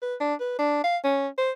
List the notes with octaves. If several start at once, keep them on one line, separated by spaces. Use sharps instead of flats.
B4
D4
B4
D4
F5
C#4
C5